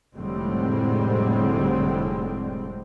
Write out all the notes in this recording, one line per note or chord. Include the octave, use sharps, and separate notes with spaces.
F1 A2 D3 G3 G#3 C4